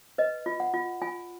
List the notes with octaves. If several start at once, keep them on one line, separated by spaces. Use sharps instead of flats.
B4 D#5
F4
F#5
F4
F4 G#5